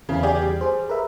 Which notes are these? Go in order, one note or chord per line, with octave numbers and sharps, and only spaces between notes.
E2 C#3 E3 E4
G4 G#4 D5
G3
G#4 C5
A#4 B4 E5